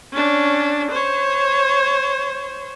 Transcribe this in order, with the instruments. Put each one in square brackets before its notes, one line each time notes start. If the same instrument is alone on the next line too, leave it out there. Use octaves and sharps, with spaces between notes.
[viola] C#4 D4
C5 C#5